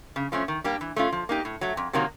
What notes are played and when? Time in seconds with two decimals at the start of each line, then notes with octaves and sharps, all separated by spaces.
0.16 C#3
0.32 F3 A3 C#4
0.48 D#3
0.64 G3 A#3 D4 G4
0.81 E3
0.96 A3 C#4 F4
1.12 F3
1.29 A#3 D#4 G4
1.45 A2
1.61 F#3 A3
1.77 F2
1.93 C3 D#3 F#3 A#3